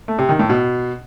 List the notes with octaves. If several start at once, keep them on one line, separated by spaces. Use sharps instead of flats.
A3
C3
D#3
A2
B2